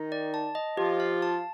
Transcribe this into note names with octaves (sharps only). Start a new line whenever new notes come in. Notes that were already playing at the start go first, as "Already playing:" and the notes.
Already playing: D#3 D#4
D5
A5
D#5
F3 F4 G4
F5
A5